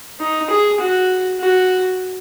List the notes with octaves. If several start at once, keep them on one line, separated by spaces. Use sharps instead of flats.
D#4
G#4
F#4
F#4